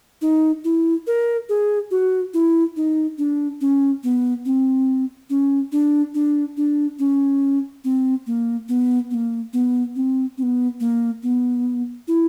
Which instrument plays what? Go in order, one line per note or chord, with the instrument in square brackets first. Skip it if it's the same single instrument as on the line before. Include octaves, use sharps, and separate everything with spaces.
[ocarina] D#4
E4
A#4
G#4
F#4
E4
D#4
D4
C#4
B3
C4
C#4
D4
D4
D4
C#4
C4
A#3
B3
B3
A#3
B3
C4
C4
B3
A#3
B3
E4